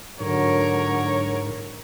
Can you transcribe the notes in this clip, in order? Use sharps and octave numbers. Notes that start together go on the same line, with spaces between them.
G#2 D3 F#3 A#4 C#5